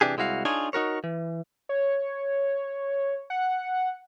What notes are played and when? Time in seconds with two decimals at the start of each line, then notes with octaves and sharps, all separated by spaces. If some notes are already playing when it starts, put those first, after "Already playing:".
0.01 C3 E3 D4 G4 G#4
0.17 C2 G#3 E4 F#4 F5
0.45 D4 D#4 F4 G#4 C#5 G#5
0.73 D#4 F#4 A#4 C#5
1.04 E3
1.69 C#5
3.30 F#5